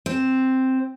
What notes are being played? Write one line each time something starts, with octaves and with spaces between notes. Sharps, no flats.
C4